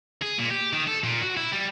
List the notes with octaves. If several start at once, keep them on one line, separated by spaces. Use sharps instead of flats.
G#4
A#2
G4
D#3
A4
A#2
F#4
E4
G3